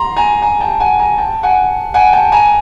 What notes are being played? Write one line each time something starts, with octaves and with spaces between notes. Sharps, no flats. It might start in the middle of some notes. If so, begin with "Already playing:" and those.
Already playing: A#5 C6
G#5 A#5
G#5 A#5
G5 A5
F#5 G#5
G#5 A#5
G5 A5
F#5 G#5
F#5 G#5
G5 A5
G#5 A#5